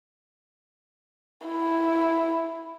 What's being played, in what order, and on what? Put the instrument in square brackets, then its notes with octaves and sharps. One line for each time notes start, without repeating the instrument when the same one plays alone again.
[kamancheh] E4